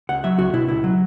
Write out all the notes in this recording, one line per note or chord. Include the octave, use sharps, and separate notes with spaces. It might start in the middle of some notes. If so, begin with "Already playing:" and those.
C#2 F#5
F#3 E5
C#2 F#4
B2 E4
C#2 E4
F#3